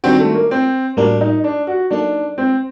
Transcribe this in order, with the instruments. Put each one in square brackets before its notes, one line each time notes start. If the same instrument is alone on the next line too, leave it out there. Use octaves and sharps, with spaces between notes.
[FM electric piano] D#3 G3 D4 F#4 [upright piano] C4
[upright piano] A3
A#3
C4
[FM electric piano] A2 G3 A#3 F#4 A#4 [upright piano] D4
[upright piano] D#4
D4
F#4
[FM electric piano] F#3 A#3 D#4 A4 [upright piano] D4
[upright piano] C4